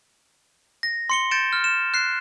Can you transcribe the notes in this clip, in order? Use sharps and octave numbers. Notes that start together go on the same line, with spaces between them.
A#6
C6 C#7 G7
G6 A6 C#7 D7 E7
F6
E7
F#6 C7